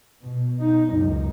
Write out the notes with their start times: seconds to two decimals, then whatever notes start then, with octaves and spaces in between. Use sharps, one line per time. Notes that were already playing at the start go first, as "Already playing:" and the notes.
0.22 B2
0.60 D#4
0.91 C#2 F#2